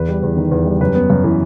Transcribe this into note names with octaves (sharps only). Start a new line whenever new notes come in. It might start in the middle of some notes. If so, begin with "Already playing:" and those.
Already playing: E2 B4
G3
E2
D#3
E2
G3
F#2 B4
B3
F#2
E3